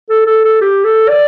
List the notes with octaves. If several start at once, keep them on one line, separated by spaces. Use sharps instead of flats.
A4
A4
A4
G4
A4
D5